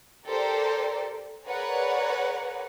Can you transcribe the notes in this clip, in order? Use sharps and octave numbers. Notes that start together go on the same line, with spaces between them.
G4 A4 A#4 C5 D5
G#4 A#4 B4 C#5 D5 F#5